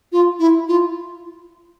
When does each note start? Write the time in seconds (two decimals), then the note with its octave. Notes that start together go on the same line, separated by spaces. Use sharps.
0.12 F4
0.39 E4
0.68 F4